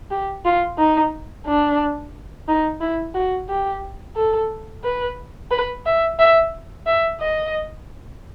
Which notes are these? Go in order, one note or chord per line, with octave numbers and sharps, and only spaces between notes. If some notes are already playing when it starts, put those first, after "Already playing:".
G4
F4
D#4
D4
D#4
E4
F#4
G4
A4
B4
B4
E5
E5
E5
D#5